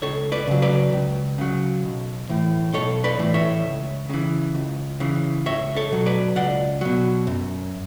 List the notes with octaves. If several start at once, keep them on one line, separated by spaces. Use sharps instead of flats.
C#2 A4 C#5
B4 D5
C#3 F#3
B4 D5
C#2
C#3 F#3
B1
A2 E3
B1 A4 C#5
B4 D5
A2 E3
C#5 E5
C#2
C#3 E3
C#2
C#3 E3
C#2 C#5 E5
A4 C#5
B2 F#3
B4 D5
C#2 D5 F#5
B2 F#3
F#2